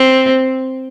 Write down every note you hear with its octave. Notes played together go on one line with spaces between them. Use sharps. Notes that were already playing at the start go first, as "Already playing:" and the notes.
Already playing: C4